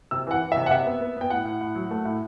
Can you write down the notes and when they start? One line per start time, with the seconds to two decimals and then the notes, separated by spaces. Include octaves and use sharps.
0.11 C3 E6
0.27 E3 F#5
0.41 E3
0.52 C3 E5
0.66 F#5
0.71 C3 E5
0.86 B3
1.01 B3
1.17 B3 G5
1.30 A2 F#5
1.45 A2
1.61 A2
1.75 F#3
1.91 A3
2.05 A2